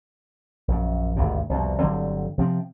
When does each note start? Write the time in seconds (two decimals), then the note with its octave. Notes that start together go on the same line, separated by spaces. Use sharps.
0.68 A#1 F#2
1.16 G#1 D2 G2 C3
1.49 C2 F2 B2
1.80 G1 D3 F#3 C4
2.38 C3 F3 C4